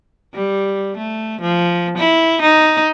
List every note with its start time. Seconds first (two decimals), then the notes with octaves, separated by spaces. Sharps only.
0.34 G3
0.98 A3
1.42 F3
1.98 E4
2.42 D#4